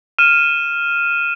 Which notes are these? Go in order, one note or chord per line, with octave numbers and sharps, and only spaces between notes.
F6 D#7 E7